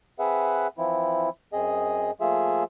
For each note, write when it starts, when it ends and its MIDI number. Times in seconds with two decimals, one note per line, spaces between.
0.19 0.67 60
0.19 0.67 68
0.19 0.67 71
0.19 0.67 76
0.19 0.67 78
0.78 1.29 52
0.78 1.29 53
0.78 1.29 60
0.78 1.29 64
1.53 2.11 42
1.53 2.11 60
1.53 2.11 68
1.53 2.11 75
2.21 2.64 53
2.21 2.64 57
2.21 2.64 58
2.21 2.64 65
2.21 2.64 68
2.21 2.64 76